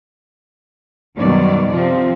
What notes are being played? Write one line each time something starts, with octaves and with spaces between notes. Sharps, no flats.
F#2 B2 D#3 F#3 G3 D5
C3 F3 C4